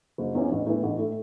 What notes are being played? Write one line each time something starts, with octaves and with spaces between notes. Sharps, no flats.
F#1
E2 E3 C#4
A1
A2 E3 B3
A1
A2 A3